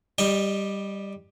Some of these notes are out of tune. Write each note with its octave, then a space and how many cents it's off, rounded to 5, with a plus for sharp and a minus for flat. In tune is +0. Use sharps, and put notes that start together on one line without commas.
G3 +5 D#5 -15 G5 +0